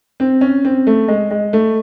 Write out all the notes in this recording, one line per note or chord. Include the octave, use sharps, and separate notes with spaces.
C4
C#4
C4
A3
G#3
G#3
A3